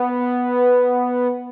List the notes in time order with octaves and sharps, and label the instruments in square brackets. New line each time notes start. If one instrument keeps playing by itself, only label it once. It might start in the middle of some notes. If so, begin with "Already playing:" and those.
Already playing: [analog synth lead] B3